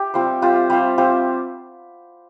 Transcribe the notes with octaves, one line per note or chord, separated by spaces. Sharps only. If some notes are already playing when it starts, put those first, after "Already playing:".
Already playing: G4
G3 C4 F4 C5
G3 C4 F4 C5
G3 C4 F4 C5
G3 C4 F4 C5